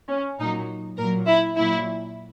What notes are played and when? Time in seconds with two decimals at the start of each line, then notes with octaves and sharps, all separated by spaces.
0.09 C#4
0.39 A#2 F#3 D#4
0.98 A#2 A#4
1.02 F#3
1.27 E4
1.56 A#2 F#3 E4